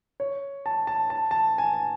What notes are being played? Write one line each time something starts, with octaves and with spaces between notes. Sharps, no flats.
C#5
A5
A5
A5
A5
G#5
G#5